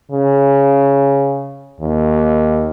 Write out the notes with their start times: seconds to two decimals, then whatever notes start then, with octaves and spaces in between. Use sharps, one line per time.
0.11 C#3
1.81 D#2